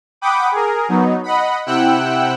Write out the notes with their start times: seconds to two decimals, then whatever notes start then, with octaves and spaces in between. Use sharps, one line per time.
0.21 F#5 G5 B5 D6 D#6
0.51 G#4 A#4
0.89 F#3 B3 D#4
1.23 D#5 F#5 B5
1.66 C3 E4 F#5 G5 E6 F#6